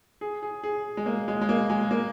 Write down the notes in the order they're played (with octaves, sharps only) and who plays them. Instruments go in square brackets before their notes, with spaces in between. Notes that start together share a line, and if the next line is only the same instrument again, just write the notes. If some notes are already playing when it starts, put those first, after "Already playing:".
[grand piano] G#4
G#4
G#4
G#3
A#3
G#3
G#3
A#3
G#3
A#3